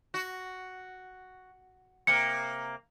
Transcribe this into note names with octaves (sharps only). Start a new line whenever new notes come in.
F#4
C3 A#3 C#7